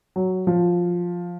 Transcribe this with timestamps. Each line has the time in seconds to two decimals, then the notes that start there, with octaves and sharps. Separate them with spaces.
0.16 F#3
0.47 F3